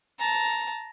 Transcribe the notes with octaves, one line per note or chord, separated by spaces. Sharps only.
A5 A#5